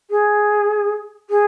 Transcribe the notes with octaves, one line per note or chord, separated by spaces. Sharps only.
G#4
G#4